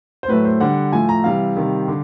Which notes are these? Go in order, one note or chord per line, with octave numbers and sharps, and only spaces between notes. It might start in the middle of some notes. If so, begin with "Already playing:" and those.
C5
A2 F#3 A3 B4
C5
D3 G3 F#5
A2 F3 A3 G#5
A#5
C3 E3 G3 F5
C3 D#3 G3
D3